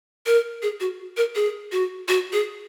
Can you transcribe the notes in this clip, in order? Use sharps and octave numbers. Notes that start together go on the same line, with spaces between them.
A#4
G#4
F#4
A#4
G#4
F#4
F#4
G#4